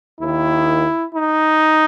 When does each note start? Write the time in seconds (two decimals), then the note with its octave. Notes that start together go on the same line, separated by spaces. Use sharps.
0.20 D#2 D#3 E4
1.15 D#4